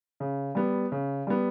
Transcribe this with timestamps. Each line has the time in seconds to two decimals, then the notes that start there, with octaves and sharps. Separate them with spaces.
0.20 C#3
0.55 G3 B3
0.92 C#3
1.27 G3 B3